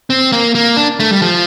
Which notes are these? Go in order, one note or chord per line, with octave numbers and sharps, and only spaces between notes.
C4
A#3
A#3
D4
A3
G3
F3